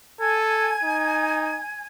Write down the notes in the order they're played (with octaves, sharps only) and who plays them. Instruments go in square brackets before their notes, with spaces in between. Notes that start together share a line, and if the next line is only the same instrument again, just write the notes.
[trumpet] A4 [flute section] G#5 G#6
[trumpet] D#4